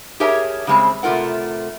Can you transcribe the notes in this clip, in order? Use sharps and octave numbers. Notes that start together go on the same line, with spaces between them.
G4 G#4 A#4 C#5 E5 A5
C#3 G3 G#3 C4
C3 A3 F4 A#4 F#5